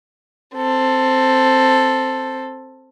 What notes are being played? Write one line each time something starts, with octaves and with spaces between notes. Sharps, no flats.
C4 A4